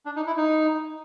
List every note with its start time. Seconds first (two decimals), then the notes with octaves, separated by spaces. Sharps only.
0.06 D4
0.16 D#4
0.27 E4
0.37 D#4